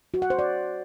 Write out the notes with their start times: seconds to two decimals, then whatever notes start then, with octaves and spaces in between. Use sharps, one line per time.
0.14 F#4
0.22 F#5
0.30 C5
0.39 D5